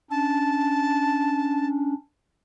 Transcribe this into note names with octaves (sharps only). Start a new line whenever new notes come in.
C#4 D4 A5